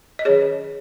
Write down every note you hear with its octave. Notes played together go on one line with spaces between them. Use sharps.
D#5
D#3 F#3 C#4 G#4 C#5